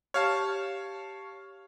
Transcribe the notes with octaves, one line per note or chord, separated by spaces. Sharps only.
G4 C#5 F5 A5 F6